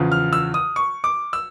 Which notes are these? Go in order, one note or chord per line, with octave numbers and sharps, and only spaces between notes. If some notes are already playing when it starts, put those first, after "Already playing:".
Already playing: E2 C#3 F3
F6
E6
D#6
C#6
D6
E6